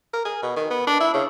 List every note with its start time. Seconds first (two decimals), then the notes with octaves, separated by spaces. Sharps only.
0.13 A#4
0.25 G#4
0.42 B2
0.56 D#3
0.70 B3
0.87 D4
1.00 E4
1.14 C#3